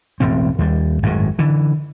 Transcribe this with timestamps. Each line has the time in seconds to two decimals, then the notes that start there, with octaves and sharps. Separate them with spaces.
0.20 E1 A1 A2 C4
0.59 D#2 G3
1.03 G#1 F#2 A2
1.39 D3 E3